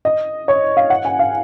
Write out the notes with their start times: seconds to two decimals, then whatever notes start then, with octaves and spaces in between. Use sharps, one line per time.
0.05 D#5
0.48 C#5
0.77 F5
0.90 F#5
1.05 G#5
1.19 F5